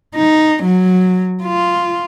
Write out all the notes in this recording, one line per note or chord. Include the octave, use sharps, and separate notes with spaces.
D#4
F#3
F4